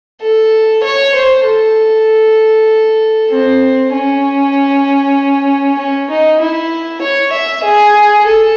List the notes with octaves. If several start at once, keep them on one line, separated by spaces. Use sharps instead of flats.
A4
C#5
C5
A4
C4
C#4
C#4
D#4
E4
C#5
E5
G#4
A4